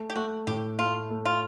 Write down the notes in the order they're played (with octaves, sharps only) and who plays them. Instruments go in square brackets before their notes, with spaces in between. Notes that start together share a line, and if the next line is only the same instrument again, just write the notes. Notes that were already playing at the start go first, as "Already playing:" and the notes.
Already playing: [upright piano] A3
[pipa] G4
[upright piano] A3 [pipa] F#4
[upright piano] A2 [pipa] G4
[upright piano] A3 [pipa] F4
[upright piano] A3
[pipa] F4